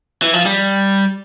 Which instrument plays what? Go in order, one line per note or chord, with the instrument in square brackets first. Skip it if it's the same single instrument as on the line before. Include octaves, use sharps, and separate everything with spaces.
[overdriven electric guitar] E3
F3
G3